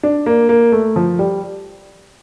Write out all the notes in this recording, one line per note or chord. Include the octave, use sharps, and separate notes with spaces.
D4
A#3
A#3
A3
F3
G3